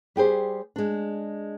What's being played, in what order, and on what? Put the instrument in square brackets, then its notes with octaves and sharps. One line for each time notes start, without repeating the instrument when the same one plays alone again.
[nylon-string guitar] G3 G4 G#4 C5
G#3 D4